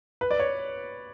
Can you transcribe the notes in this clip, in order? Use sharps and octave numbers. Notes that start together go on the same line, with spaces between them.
B4
D5
C#5